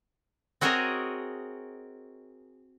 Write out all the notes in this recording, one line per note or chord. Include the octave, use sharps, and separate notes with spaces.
C4 F#4 G#4 A#4 C#5 D#5